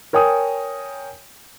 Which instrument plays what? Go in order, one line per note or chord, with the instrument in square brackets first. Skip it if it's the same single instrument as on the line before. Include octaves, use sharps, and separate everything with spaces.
[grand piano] A#4 C#5 G5 G#5 D#6